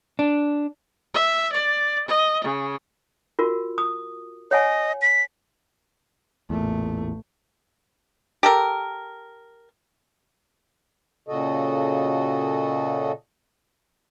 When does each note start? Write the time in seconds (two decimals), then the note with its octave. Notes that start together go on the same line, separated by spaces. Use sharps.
0.19 D4
1.14 E5
1.52 D5
2.07 D#5
2.43 C#3
3.39 F4 F#4 A#4
3.78 D#6
4.51 C#5 D#5 F#5 G#5
5.02 B6
6.50 A1 E2 A#2 A3
8.43 G4 A4 A#4
11.28 A#2 C#3 F#4 A4 D#5